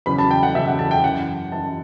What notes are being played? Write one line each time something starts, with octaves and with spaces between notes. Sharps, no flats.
E2 C#3 F#3 B5
A5
G5
F#5
E2 C#3 F#3 E5
F#5
A5
G5
F#2 E3 F#5
F#2 E3 A5